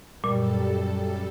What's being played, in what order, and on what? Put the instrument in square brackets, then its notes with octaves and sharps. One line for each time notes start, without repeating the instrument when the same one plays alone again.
[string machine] F#2 A4 [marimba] A#2 [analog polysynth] G3